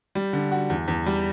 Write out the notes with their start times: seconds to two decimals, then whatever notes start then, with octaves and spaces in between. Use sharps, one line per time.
0.15 G3
0.33 D3
0.51 F#4
0.70 E2
0.88 E2
1.06 G3